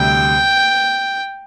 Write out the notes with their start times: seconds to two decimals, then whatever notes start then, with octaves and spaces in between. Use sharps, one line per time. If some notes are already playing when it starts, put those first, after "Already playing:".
Already playing: D2 C3 G3 G5